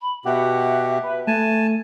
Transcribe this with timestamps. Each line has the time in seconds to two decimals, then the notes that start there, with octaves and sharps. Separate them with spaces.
0.01 B5
0.25 B2 G4 E5 F#5
1.03 B4
1.27 A3 G#5 A5